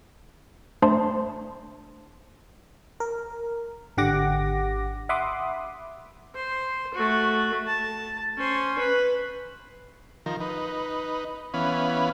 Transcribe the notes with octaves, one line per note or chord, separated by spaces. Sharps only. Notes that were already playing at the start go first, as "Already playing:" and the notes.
A3 D4 C5 A5 C6
A#4
G#1 D3 G4 F#5 D6 A#6
E5 F#5 B5 C6 D6 D#6
C5
A3 F#4
A5
C#4 C5
B4
D#3 F3 A#4
D#4 B4
E3 B3 C#4 F5 B5